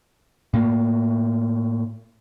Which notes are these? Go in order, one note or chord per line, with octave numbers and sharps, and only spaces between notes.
A2 A#3